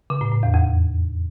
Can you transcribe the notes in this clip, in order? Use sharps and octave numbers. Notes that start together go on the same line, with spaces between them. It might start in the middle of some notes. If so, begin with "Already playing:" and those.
C#3
A2
A2
E2
F2